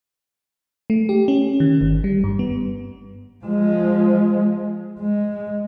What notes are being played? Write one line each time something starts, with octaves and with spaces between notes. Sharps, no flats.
A3
G4
C#4
D#3
G1
G3
G2
B3
F3 G#3
G#3